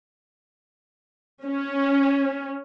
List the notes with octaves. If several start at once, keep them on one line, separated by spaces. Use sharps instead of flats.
C#4